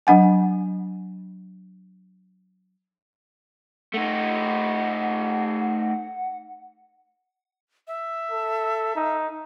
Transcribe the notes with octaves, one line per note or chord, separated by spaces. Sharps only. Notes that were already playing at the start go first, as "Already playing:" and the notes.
F#3 D4 F#5 G#5
A3 D#4 F#5
E5
A4
D#4